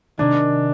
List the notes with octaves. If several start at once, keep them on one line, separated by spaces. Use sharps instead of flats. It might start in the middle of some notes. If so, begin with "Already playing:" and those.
C3 D#3 G#3 D4 D#4 G#4